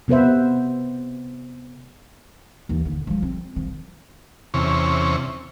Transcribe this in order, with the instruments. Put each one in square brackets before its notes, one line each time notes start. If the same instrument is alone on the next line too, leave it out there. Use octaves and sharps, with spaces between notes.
[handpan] C3 B3 B4 C5 E5
[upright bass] D#2 E3
D3
F3 G#3
C4
D#3 F3
[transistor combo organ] E2 C3 C#4